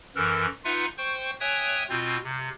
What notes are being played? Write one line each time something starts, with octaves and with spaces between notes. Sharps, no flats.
F#2 E3 A4 A#4 F6 F#6
D#4 F4 B4 E5 F#5
C5 G5 C#6
C#5 E5 G5 G#5 D#6 F#6
B2 C4 F4 G6
C3